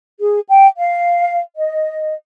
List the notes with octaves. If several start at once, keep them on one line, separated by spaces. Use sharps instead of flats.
G#4
G5
F5
D#5